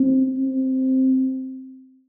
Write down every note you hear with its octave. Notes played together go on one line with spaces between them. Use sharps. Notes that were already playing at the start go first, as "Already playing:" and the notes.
Already playing: C4
C4